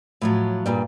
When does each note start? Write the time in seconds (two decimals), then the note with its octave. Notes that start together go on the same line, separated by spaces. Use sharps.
0.21 A2 F3 F#3
0.66 G2 A#2 G3